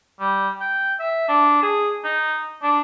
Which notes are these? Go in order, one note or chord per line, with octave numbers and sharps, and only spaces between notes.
G3
G5
E5
D4
G#4
D#4
D4